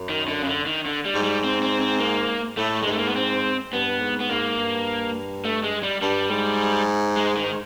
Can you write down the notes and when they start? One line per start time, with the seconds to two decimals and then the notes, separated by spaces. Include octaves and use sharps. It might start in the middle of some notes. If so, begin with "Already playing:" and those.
Already playing: F#2
0.09 D#3
0.28 D3
0.42 C#3
0.48 D3
0.66 D#3
0.85 D3
1.05 G3
1.14 G#2
1.23 G3
1.44 C4
1.63 C4
1.81 C4
2.00 A#3
2.57 A2 A3
2.82 G#3
2.86 G#2
2.92 A3
2.98 A#3
3.06 B3
3.15 C4
3.73 G2 B3
4.02 G#2
4.20 B3
4.30 G#2 A#3
4.59 G2
5.45 A3
5.64 G#3
5.83 G3
6.01 G2 G3
6.31 G#2
7.17 G#3
7.37 D#3